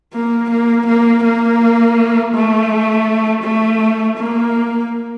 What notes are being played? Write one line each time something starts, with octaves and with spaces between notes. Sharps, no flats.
A#3
A#3
A#3
A#3
A3
A3
A#3